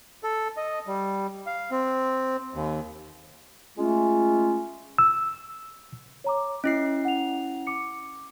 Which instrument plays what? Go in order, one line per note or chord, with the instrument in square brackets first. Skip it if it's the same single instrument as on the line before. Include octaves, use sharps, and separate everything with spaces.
[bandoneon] A4
D#5
G3
F5
C4
D#2
[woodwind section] G#3 A3 C#4 F4
[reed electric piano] E6
[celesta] C#5 A#5 D6
[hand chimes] C#4 E4 C7 [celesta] D#5
[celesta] F#5 F7
D6 C#7